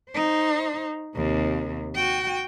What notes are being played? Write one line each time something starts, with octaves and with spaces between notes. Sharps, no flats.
D#4 C5
D#2 C3
F#4 G5